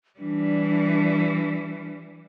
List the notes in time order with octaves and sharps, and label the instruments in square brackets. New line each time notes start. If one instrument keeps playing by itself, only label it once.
[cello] E3 G3 [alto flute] D4